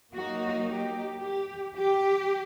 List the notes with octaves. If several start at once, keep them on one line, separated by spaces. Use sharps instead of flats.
F#3 A#3 D#4 F#4
G4
G4
G4